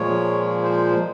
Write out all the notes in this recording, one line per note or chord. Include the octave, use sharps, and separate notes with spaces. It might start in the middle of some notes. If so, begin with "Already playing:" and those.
Already playing: A#2 F3 G#3 C#5
C5